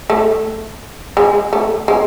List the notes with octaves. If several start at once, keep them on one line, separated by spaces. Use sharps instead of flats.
A3
G#3
A3
G#3